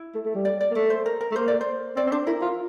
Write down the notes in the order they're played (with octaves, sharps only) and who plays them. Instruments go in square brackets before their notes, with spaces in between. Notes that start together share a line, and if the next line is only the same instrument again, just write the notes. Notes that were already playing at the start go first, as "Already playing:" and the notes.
Already playing: [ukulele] E4
[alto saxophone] A3
A3
G3
[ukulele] D5
D5
[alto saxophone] A#3
[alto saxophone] A3 [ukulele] D5
[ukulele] C5
A#4
A#4
[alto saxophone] A3
[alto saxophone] A#3 [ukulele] C5
[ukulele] D5
C5
[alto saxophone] C4 [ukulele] D5
[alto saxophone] C4
[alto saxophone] D4 [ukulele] C5
[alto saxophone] E4 [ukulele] A#4
[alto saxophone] F4